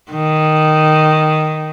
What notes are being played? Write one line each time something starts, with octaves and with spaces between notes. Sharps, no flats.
D#3